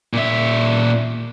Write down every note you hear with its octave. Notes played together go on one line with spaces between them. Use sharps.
A#2 E5